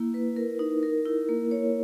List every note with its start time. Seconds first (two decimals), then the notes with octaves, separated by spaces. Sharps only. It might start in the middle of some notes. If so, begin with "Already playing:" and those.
Already playing: A#3 E4
0.14 B4
0.36 A#4
0.59 D#4
0.83 A#4
1.06 E4
1.29 A#3
1.51 C#5